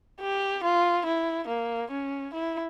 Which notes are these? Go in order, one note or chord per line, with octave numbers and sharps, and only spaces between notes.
G4
F4
E4
A#3
C#4
E4